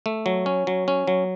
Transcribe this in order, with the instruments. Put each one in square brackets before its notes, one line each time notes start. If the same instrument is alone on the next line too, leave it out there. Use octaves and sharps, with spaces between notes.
[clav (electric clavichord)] A3
F#3
C#4
F#3
C#4
F#3